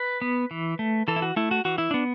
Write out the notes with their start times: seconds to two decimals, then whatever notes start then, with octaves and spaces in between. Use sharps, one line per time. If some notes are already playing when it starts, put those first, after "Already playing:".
Already playing: B4
0.22 B3
0.51 E3
0.79 A3
1.08 E3 A4
1.16 E4
1.22 F#4
1.36 A3 E4
1.51 F#4
1.65 E3 F#4
1.78 E4
1.91 B3 D4